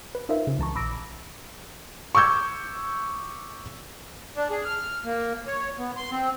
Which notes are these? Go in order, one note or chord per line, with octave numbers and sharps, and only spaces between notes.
B4
D#4 F4 A#4 C5 E5
C#3
C#2 E3 A5 A#5 C#6
A#1 B5 D6 E6 A#6 D7
C#6 D6 E6 G6 G#6
D4
G#4
F6
A#3
C#5
B3
C6
C4